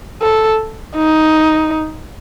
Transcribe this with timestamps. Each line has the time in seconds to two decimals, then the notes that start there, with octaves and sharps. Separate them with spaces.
0.21 A4
0.95 D#4